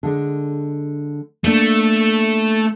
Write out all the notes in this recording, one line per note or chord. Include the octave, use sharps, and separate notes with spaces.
D3 G#3 D4
A3 A#3 D4